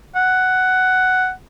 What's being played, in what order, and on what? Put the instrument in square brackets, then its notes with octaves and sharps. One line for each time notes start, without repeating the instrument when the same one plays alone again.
[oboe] F#5